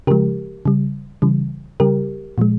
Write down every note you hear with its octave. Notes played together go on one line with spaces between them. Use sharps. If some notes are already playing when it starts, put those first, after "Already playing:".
C#3 F3 G#3 G4 A#4
C#3 G3
C#3 E3 G3
C#3 G3 G4 A#4
A#2 F3 G#3